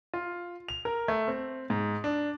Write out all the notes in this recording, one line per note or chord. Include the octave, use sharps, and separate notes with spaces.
F4
F7
A#4
A3
C4
G#2
D4